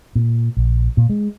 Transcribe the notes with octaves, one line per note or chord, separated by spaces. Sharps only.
A#2
A#1
A#2
G#3